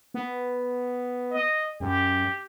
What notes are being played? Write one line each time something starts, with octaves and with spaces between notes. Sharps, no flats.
B3
D#5
F#2 G4